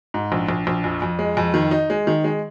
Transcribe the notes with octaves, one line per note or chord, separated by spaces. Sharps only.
G#2
A#1
A#1
A#1
F2
F2
G#3
F2
D#3
D#4
G#3
D#3
G#3